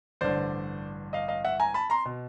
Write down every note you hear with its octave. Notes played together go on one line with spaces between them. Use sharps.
A1 G2 D3 C5 D5
D#5 F5
D#5 F5
E5 F#5
G#5 A#5
A5 B5
A#5 C6
B2